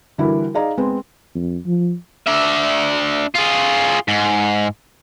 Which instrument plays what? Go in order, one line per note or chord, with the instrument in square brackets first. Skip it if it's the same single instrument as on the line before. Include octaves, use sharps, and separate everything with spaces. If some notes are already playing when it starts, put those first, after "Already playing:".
[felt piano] D3 E3 G3 E4 F#4 A#4
D#4 G#4 D5 D#5 F5 A#5
G#3 B3 C4
[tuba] F2
F3
[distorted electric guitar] D4 E5
F4 G#4
G#2